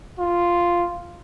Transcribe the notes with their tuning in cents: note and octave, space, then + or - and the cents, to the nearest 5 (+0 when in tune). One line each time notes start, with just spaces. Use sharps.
F4 -5